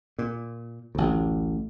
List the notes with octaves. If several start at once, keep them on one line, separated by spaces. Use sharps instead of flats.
A#2
A1 D2